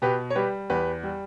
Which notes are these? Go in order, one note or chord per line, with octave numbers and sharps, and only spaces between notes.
B2 G4 B4
C#5
G3 G4 B4
E2 G4 B4
G3